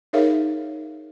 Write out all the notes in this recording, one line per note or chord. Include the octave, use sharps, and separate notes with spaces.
D#4 G#4 A#4 C#5 E5 F5